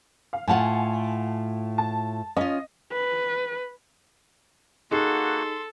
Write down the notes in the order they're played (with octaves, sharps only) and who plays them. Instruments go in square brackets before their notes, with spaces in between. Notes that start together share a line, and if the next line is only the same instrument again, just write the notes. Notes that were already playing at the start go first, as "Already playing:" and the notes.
[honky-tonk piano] F5
[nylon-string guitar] A2 F4 F#5 [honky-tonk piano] G#5 A5
[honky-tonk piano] A5
[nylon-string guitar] C#4 F4 [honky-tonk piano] D#5
[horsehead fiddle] B4
[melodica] A#3 F#4 F#5 [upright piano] D#4 G#4 [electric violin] A4 [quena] C6